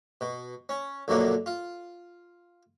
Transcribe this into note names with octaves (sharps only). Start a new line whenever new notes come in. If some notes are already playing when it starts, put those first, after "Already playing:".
B2
C#4
A#1 F#2 B2 D3 F#3 A#3
F4